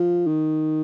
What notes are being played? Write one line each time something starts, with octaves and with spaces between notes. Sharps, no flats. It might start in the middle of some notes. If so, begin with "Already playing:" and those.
Already playing: F3
D#3